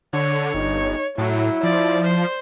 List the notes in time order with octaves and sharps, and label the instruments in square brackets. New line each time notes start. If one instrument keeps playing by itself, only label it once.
[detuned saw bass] D3 [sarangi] C#5
[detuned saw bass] G1 [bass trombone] D#4
[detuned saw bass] A2 [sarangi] F#3 [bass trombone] E4
[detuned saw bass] F3 [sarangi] D5
[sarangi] C5